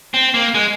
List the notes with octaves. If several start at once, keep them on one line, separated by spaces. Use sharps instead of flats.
C4
A#3
G#3